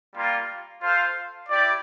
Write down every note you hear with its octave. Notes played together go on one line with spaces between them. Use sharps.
G3 A#3 F4
F4 A4 C5 F5
E4 G4 D5